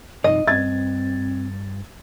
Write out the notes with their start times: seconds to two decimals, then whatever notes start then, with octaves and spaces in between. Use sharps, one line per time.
0.24 G2 C3 F3 D#4 D#5
0.48 G2 C4 G#6 A6